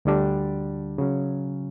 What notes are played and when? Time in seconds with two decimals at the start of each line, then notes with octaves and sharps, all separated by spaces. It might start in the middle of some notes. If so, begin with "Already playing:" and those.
0.05 D2 D3 G3 D4
0.98 C#3 F#3 C#4